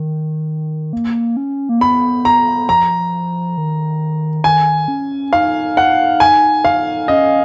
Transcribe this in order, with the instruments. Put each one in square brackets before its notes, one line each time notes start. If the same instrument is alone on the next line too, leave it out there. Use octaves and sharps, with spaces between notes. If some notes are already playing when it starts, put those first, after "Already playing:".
Already playing: [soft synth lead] D#3
A#3
C#4
A#3
[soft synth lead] B3 [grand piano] B5
[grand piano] A#5
[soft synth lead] F3 [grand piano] A#5
[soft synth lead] D#3
[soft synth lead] D#3 [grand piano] G#5
[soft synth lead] C#4
[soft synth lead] D#4 [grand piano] F5
[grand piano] F#5
G#5
F5
[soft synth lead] C#4 [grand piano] D#5